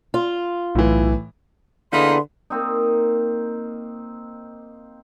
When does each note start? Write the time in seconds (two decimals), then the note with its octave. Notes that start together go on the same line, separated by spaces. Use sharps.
0.14 F4
0.75 B1 A2 E3
1.93 D3 A#3 D#4 E4 G#4 B4 C6
2.50 A#3 C4 D#4